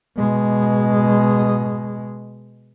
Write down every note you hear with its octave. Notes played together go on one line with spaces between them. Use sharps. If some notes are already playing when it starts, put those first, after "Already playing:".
B2 G#3